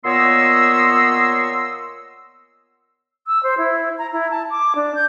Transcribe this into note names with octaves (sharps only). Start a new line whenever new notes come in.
A#2 B3 C#5 D#5 C6 E6
E6
C5
E4
A#5
E4
A5
D6
D4
G6